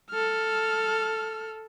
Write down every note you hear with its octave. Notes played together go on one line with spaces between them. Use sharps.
A4 F6